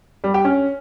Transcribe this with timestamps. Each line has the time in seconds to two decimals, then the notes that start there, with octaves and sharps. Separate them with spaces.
0.24 G3
0.34 G4
0.45 C#4